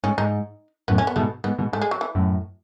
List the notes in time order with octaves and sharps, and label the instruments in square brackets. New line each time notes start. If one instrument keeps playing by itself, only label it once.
[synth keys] G#2 [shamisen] C#4
[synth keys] G#2 [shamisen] D#4
[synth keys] F#2 A2 [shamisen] B3
[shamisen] C#4
B3
[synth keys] G#2 B2 [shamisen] A3
[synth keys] G#2 [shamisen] B3
[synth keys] G#2 B2
[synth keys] G#2 [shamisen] A3
[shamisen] G#3
F#3
E3
[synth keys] F#2 A2